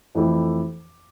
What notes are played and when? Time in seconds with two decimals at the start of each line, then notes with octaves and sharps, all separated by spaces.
0.15 F2 E3 A3 E4 G4